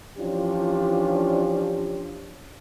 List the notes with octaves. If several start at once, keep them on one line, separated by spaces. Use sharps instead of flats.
E3 F3 C#4 D4 F4 G4